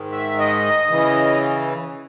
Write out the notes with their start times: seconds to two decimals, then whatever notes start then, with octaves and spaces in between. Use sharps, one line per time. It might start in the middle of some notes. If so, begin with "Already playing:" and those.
Already playing: G#2 D#3
0.12 E5
0.38 D#5
0.90 C#3 E3